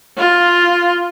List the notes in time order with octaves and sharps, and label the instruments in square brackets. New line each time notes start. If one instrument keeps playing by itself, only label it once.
[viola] F4